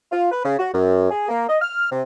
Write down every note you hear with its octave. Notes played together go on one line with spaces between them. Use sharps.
F4
B4
C#3
F#4
F#2
G#4
A#3
D#5
F6
C3